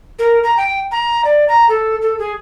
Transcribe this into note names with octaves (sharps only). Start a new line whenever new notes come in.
A#4
A#5
G5
A#5
D5
A#5
A4
A4
G#4